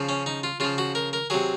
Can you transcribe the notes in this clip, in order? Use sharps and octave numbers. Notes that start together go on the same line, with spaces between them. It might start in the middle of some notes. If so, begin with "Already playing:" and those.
Already playing: C#3 F3
C#4
D#4
F4
C#3 F3 F4
F#4
A#4
A#4
C3 F#3 G#4